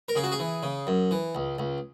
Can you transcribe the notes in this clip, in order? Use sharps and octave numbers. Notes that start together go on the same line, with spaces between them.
A#4
C#3 G#4
F#4
G#4
E3
C#3
F#2
E3
C#2
C#2